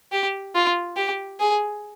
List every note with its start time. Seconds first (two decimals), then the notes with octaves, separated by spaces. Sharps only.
0.12 G4
0.55 F4
0.97 G4
1.40 G#4